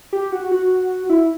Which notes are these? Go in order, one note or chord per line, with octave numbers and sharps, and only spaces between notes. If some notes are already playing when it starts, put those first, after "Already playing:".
G4
F#4
F#4
E4